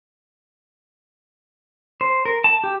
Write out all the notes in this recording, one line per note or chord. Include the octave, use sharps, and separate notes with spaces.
C5
A#4
A5
G4